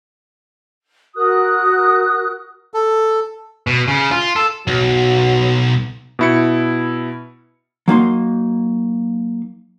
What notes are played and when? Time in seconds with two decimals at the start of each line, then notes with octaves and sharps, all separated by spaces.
1.16 F#4 A#4 D#6 F#6
2.74 A4
3.67 B2
3.88 C#3
4.11 F4
4.36 A4
4.68 B1 F#3
6.19 B2 E4 C#7
7.88 F#3 A#3 D#4 C6